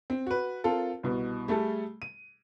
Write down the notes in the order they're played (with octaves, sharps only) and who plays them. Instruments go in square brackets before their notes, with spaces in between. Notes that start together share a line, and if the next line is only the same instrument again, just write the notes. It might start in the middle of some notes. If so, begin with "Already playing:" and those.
[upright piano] C4
F#4 B4
C4 F4 A4 A#4
C2 B2
G3 A3 G#4 A4
D#7